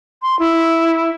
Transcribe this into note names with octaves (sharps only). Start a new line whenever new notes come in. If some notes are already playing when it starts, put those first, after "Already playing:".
C6
E4